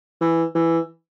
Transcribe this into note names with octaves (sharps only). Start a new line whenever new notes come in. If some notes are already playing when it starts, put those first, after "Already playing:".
E3
E3